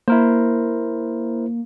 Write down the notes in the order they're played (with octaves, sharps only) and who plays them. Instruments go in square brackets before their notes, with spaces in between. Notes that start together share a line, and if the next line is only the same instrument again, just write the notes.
[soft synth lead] A#3 [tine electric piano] E4 A#4 C5